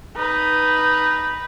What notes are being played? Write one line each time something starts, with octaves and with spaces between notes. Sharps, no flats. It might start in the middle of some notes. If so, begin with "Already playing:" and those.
D#4 B4